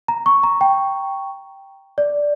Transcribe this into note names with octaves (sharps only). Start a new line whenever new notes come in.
A#5
C#6
A#5
G5
D5